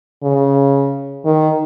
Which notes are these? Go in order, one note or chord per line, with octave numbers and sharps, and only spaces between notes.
C#3
D#3